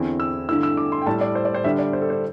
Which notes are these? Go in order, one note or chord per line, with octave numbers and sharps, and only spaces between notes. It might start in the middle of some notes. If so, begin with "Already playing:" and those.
Already playing: E2 D3 C4 E4
E6
G2 D3 A3 E4 E6
E6
D6
C6
G5
A2 G3 E4 A5
D5
C5
D5
C5
D3 G3 D4 E5
D5
C5
A4
C5